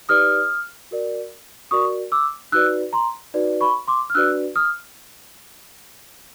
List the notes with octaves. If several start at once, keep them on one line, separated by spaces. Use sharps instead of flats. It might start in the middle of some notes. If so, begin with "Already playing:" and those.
D#4 G4 B4 D5 D#6 F6
F#4 A#4 D5
F#4 A#4 D5 C#6 D#6
D6 E6
D#4 F#4 B4 D5 E6 F#6
A#5 C6
D#4 F#4 B4 D5
B5 C#6
C6 D6
F6
D4 F#4 B4 D5 E6 F#6
D#6 F6